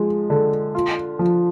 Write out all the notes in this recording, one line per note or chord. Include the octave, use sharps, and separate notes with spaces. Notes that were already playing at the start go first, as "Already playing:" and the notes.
Already playing: F3 G#3
D3
F4
F3